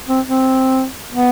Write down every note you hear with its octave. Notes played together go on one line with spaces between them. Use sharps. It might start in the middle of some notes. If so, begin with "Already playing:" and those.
C4
C4
B3